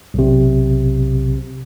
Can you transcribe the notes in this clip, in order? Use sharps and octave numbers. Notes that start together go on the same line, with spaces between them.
B1 C3